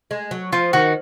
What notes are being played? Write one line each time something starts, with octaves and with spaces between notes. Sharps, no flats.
G#3
F#3
F3 F4
D#3 F#4